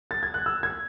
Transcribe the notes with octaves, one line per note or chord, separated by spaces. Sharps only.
A6
G#6
F#6
E6
G#6